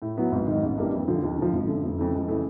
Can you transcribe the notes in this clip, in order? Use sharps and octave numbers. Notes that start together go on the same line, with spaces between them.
A2
F#3 B3 E4
G#1
G#2 D#3
A1
G2 E3 G3 A#3
F2
D3 F3
D#2
D3 F3
G#1
F#2 D3
F1
F2 C#3 E3 A3
C#2
C#3 E3 A3